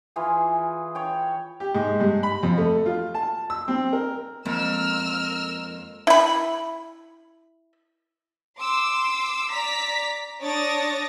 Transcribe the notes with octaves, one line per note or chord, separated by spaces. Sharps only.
E3 F4 G#4
C#5 G5
G4
G#2
G2
B5
F2
A3
F4
A5
E6
C4
A#4
F2 G#3 A#3 C4 A#4 E6 F6
E4 B5
C6 D6 E6
D5 A#5 B6
D4 C#5 D5 D#6 A6 A#6